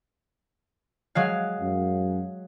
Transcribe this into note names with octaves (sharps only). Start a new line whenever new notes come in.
F#3 G#3 F5
F#2